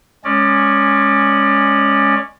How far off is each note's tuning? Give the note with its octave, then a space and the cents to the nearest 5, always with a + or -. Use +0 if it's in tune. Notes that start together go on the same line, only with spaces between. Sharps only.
G#3 -5 C#4 +0 D5 +15